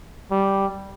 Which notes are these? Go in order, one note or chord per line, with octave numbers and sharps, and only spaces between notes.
G3